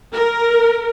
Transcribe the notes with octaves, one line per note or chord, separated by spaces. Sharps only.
A#4